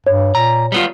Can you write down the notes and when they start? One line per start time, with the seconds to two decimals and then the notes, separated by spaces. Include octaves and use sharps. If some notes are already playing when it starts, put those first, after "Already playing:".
0.07 G2 C#5
0.35 A#2 A#5
0.72 G3 B3 F4